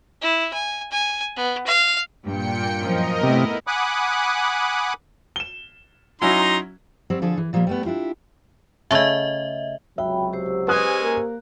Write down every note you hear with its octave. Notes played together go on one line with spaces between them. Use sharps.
E4
G#5
G#5
B3
F5
G2 A#2 G5 C#7
F#2 F3 A#4 D#5
C3 A3 B3 E4
F#5 G#5 B5 D6 D#6 F#6
E7 G7
F#3 C#4 D#4 E4 A#5 C6
F#3 G3 C4
D3 F3 D4 G#4 A4
E3
A#2 F3 G3 A3 A#3
G3 A3 B3
D4 E4 F4 G4
C#3 A3 D#5 E5
C#2 C3 F#3 F#4 E5 G5 B5
G4 C5 E6
G#3 C#4 B4 G#5 D#6 F#6
A#3 A#4